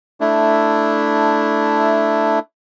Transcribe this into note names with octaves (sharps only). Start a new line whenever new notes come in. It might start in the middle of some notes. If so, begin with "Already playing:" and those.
A3 D4 E4